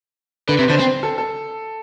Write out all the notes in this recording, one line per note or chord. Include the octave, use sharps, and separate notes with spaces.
D3 B4
C3
D3 C5
C4
A4
A4